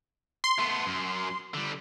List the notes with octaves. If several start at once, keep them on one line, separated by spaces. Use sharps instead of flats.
C6
A3 B3
F#2
D3 G3